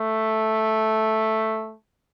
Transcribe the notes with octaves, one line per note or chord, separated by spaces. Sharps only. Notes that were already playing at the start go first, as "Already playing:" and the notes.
Already playing: A3